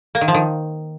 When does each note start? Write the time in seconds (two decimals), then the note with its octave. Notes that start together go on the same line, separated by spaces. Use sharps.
0.15 A#3
0.21 D#3
0.28 F3
0.34 D#3